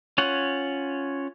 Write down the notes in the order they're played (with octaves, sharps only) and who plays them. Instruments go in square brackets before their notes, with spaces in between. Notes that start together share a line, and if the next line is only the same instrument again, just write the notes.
[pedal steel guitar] C#4 F4 C#5 F#5